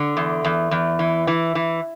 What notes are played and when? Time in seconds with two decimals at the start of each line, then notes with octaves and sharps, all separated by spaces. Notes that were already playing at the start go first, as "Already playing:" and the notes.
Already playing: D3
0.17 E2
0.44 E2
0.71 E2
0.99 E3
1.27 E3
1.55 E3